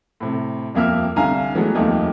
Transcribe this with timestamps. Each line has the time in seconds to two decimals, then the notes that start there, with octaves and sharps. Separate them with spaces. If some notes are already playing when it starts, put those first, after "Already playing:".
0.20 A2 C3
0.74 D#1 F2 A#3 E5 F6
1.16 C2 D3 F5 G#5 A#5
1.55 E3 F#3 G#3 A3 B3
1.75 D#1 F2 A3 A#3 D#4